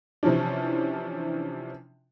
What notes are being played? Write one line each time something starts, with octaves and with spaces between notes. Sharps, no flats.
C3 E3 F3 C#4 D4